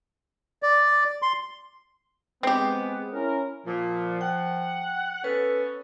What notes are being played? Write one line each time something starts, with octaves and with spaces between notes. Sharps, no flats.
D5
C6
G#3 B3 C4 G4
C#4 E4 A#4
A#2 F3
F#5 G5
B3 C#4 A4 B4